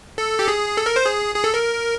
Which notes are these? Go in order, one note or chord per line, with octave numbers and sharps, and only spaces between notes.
A4
G4
G#4
A4
A#4
C5
G#4
G#4
A4
A#4